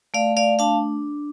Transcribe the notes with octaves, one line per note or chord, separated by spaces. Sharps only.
A3 D5 F5
D5 F5
D4 F5 A5